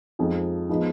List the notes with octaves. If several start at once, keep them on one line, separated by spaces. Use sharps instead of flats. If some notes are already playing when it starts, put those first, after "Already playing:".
F2 F3 G#3 D#4
F3 G#3 B3 D#4